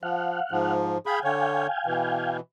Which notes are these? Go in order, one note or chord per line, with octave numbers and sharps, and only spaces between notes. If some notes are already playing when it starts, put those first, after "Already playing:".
F3 F5 F#5
G#2 F3
G#4 F5 G5 G#5 B5
D3 C#5
B2 E3